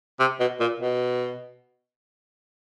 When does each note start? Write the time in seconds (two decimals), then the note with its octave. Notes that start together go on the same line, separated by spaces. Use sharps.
0.19 C3
0.40 B2
0.60 A#2
0.80 B2